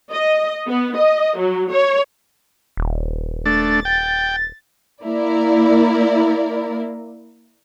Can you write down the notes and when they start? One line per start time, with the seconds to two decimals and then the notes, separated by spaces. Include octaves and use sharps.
0.11 D#5
0.67 B3
0.97 D#5
1.37 F#3
1.73 C#5
2.77 D#1
3.45 A3 D4 A6
3.85 G5
5.03 A#3 E4 A#4 D5